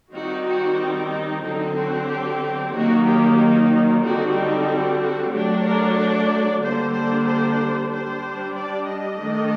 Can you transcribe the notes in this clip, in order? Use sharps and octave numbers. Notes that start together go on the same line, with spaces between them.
D#3 G3 C4 D#4 F#4
F#4
D#4
D#4
D3 F#3 C4 D#4
F#4
G4
D#3 F#3 A#3 D#4 F#4
G4
D#4
D3 G3 C4 D#4 F#4
D#4
F#4
F#4
F#3 A3 D4 G4
A#4
D5
D3 G3 A#3 D4 C5
C5
C5
G3 D4 C5
D5
D#5
D#3 A3 D4